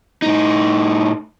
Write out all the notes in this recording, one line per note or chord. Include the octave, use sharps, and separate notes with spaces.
A2 D#4